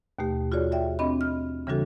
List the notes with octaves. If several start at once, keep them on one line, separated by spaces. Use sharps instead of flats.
D#2 B2 A3 G4
F4 F#4 G#4 C#5 D5
D5 E5 G5
C4 D4 D#5 B5
F6
C#3 E3 G3 D4 F#4 A4